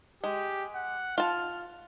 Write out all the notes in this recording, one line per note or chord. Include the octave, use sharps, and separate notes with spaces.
G#3 G4
F#5
F4 A5 F6